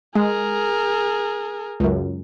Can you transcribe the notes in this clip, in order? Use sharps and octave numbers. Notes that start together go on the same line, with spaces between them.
G#3 G#4 A#4
C#2 F#2